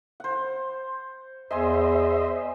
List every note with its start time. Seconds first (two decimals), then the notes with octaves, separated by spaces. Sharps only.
0.20 C5 F#5
1.51 E2 C5 D#5 E5 G#5 C6